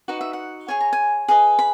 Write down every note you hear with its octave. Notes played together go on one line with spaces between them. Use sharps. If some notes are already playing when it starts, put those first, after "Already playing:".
D#4 F#4 B4 F#5
E5
F#5
G#4 C#5 G#5
A#5
G#5
G#4 B4 D#5
B5